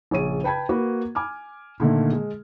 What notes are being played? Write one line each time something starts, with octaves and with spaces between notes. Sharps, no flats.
A#1 C#3 C#5 D#7
B4 G5 A5 B5 G#6
A#3 F#4 B4
G#5 D6 F6
A#2 D3 D#3 A3
G#3